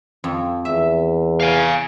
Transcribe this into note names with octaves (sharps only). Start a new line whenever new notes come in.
F2
E2 E5
F5 G#5